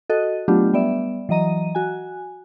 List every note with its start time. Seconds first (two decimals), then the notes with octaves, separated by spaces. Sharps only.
0.10 F#4 A4 D#5
0.48 F#3 A3 B3 D4 F4 G4
0.73 G3 B3 D5 E5
1.29 E3 F#3 D#5 A#5 D#7
1.75 F#4 G#5